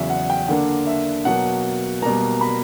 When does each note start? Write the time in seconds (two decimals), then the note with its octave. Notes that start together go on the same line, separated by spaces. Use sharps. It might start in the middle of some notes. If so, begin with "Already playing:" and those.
Already playing: E2 C#3 F#3 E5
0.10 F#5
0.30 G5
0.48 D3 A#3 D4 F#5
0.87 E5
1.25 B2 F#3 A#3 F#5
2.02 B2 G3 A#3 A#5
2.41 B5